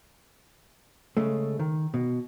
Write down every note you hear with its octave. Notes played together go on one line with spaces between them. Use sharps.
C#3 G#3 A3
D#3
B2